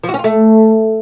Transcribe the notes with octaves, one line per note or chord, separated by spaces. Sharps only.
F3
F#4
C#4
F4
A3